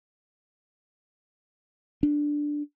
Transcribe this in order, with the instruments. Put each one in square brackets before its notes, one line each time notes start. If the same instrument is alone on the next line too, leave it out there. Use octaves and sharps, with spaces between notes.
[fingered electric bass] D4